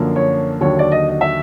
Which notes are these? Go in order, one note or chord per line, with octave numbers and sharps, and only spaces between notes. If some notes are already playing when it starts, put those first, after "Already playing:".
Already playing: F#2 D3 F3 A#3
C#5
D#2 D3 F#3 C#5
D5
D#5
D#5
E5